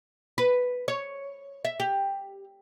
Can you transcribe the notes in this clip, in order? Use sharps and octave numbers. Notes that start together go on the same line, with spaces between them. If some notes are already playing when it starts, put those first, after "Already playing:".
B4
C#5
E5
G4